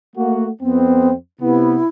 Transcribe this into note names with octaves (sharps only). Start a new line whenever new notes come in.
A3 A#3 F#4
F2 B3 C4
C3 B3 E4